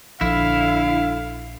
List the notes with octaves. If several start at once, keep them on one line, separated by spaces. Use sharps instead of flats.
A#1 D3 F3 E4 F5